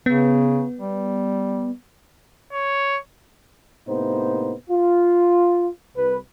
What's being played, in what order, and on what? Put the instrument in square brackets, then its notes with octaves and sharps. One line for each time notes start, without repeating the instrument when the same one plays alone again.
[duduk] C#3 [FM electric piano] B3
[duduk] G3
[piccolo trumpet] C#5
[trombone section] A2 C3 A#3 B3 D#4 C5
F4
C2 B4